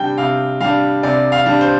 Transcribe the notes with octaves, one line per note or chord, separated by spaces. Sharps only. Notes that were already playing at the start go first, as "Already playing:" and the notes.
Already playing: C3 G3 D4 G5
C3 F5
G3 D4 F5
C3 D5
F5
G3 D4
C5